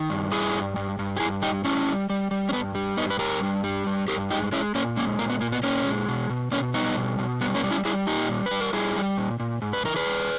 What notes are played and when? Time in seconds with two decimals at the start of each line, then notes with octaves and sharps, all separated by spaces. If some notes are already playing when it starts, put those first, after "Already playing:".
Already playing: D#3
0.10 G2
0.31 G3 E4 G#4
0.54 G2
0.76 G2
0.99 G2
1.17 G4
1.20 G2 E4 G#4
1.42 G3 D#4 G4
1.64 G3 C#4 E4
1.86 G3
2.10 G3
2.31 G3
2.49 C#4
2.53 G2 B3
2.75 G3
2.97 G2 B3 D#4
3.10 B4
3.19 G3 G4 A#4
3.42 G2
3.64 G3
3.87 G2
4.08 G2 G4 A#4
4.31 G#3 D#4 G4
4.52 G#3 C#4 E4
4.75 A#2 A#3 C#4
4.97 G#3 A#3 C#4
5.19 A#2 A#3
5.30 B3
5.41 A#2 A#3
5.52 B3
5.63 A#2 A#3 C#4
5.85 G#3
6.08 B2
6.30 B2
6.51 B2 A#3 C#4
6.74 G3 B3 D#4
6.97 B2
7.19 B2
7.41 G3 B3
7.55 A#3 C#4
7.63 G3
7.71 C#4 E4
7.85 G3 E4 G#4
8.07 A#2 D#4 G4
8.29 G3
8.46 G3 B4
8.60 A#4
8.73 G3 E4 G#4
8.96 G3
9.18 A#2
9.40 A#2
9.62 G#2
9.73 B4
9.85 E3 A#4
9.96 G#4 B4
10.06 G3